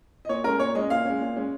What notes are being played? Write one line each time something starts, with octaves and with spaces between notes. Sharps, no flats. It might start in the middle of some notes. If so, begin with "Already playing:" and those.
D#5
A#2 C#5
G#3 C#4 A#4
A#2 C#5
G#3 C#4 D#5
A#2 F5
G#3 C#4
A#2
G#3 C#4